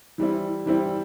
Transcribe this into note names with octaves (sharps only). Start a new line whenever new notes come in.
E3 G3 C4 E4
E3 G3 C4 E4